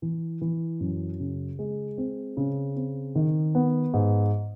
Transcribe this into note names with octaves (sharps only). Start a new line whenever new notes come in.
E3
E3
F#2
C#3
G#3
C4
C#3
C4
D#3
B3
G#2